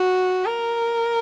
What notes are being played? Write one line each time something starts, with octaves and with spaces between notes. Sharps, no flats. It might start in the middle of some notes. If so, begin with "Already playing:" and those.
Already playing: F#4
A#4